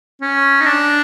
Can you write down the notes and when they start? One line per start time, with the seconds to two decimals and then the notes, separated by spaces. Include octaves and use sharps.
0.21 C#4
0.61 D#4
0.66 D4